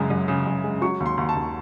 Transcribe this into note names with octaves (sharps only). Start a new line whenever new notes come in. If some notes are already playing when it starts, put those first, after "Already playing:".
Already playing: F#2 C#3 E3 G#3
F#2
C#3
F#2
G#3
F#3 C#6
D#2
C6
D#2
A5
D#2